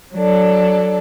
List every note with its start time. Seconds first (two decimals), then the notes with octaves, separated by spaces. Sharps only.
0.15 F#3 D4 A4